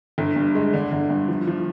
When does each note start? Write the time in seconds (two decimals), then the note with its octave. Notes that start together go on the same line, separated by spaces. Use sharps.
0.18 G1
0.36 G2
0.55 G#3
0.73 D3
0.92 G1
1.10 G2
1.28 F3
1.47 F3